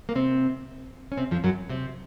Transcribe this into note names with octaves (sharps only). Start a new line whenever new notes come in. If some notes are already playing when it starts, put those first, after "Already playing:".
A#3
C3 C4
C#4
C3 C4
F2 F3
F#2 F#3
C3 C4